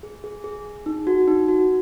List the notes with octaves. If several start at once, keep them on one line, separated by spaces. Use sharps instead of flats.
G#4
G#4
G#4
G#4
D#4
F#4
D#4
F#4